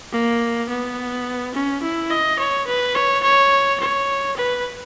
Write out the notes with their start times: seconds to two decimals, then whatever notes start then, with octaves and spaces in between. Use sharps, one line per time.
0.12 A#3
0.69 B3
1.54 C#4
1.82 E4
2.10 D#5
2.39 C#5
2.67 B4
2.95 C#5
3.23 C#5
3.80 C#5
4.37 B4